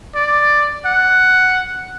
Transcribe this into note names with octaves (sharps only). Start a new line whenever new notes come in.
D5
F#5